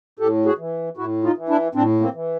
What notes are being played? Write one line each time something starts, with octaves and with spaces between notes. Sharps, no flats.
A2 G4 A4
F#4 G#4
E3
A2 E4 F#4
D#4 F4
E3
D4 E4
A2 C4 D4
A#3 C4
E3